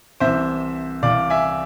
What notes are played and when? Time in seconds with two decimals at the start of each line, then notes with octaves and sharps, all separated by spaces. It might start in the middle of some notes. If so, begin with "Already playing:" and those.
0.20 C2 C3 E3 C5 E5
1.03 C2 C3 E3 D5 F5
1.30 E5 G#5